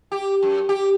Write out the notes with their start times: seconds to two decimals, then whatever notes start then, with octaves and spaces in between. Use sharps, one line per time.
0.12 G4
0.42 F#2
0.69 G4